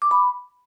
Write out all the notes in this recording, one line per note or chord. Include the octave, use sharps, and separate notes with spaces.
D6
B5